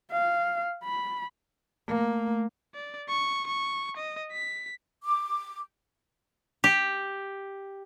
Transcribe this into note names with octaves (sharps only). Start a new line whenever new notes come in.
F5
B5
A3 A#3
D5
C#6
C#6
D#5
B6
D6
G4